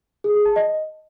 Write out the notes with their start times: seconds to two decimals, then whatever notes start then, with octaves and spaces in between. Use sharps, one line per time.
0.24 G#4
0.35 G#4
0.45 A5
0.56 D#5